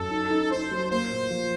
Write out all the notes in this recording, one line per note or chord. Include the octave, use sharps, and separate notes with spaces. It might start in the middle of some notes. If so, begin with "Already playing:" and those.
Already playing: F#2 A4
D#4
D#4
D#4 C5
F#3
A#3 C5
A#2
F3